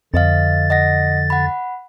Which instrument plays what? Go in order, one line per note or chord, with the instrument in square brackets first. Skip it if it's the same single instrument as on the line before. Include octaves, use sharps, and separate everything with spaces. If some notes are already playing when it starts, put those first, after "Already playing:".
[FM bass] F2 [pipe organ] D3 A6 [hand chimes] C5 D#5 F5
[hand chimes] D#5 F#5 A#6
F#5 B5